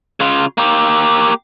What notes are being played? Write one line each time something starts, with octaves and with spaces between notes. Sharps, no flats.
C#3 F4
A#3 G4